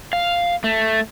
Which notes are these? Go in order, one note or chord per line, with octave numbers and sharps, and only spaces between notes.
F5
A3